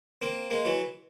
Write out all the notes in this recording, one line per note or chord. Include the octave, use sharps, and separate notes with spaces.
A#3 C4
G#3 A#3
E3 F#3